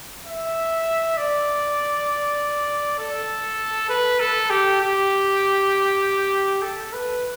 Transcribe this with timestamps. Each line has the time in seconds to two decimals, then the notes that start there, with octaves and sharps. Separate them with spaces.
0.26 E5
1.17 D5
2.99 A4
3.90 B4
4.20 A4
4.50 G4
4.81 G4
6.62 A4
6.93 B4